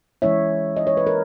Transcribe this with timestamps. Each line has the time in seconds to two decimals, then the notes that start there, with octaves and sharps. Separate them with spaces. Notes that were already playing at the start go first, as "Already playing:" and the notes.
0.22 E3 G#3 C#4 E4 C#5 E5
0.76 D#5
0.87 C#5
0.97 B4
1.07 A#4